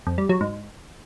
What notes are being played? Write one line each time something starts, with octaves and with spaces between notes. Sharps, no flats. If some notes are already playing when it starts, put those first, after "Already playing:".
F2
G3
F#3
G#2